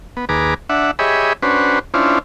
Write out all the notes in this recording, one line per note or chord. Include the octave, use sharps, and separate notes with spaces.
B3
D#2 G#4 B4 A#5 D6
D4 E5 F#5
G4 G#4 C#5 D#5 E5 B5
C#4 D4 F#4 B4 C5
C#4 D4 E4 F4 C5